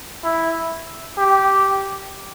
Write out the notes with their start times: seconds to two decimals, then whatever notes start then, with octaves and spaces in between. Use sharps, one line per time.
0.24 E4
1.18 G4